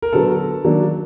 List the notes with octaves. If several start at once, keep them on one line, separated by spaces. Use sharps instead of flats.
A#4
D3 F#3 B3 A4
D#3 F#3 A#3 D4